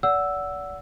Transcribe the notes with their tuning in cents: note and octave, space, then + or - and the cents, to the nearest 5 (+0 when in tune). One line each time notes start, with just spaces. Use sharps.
D5 -35 F#5 +0 E6 +0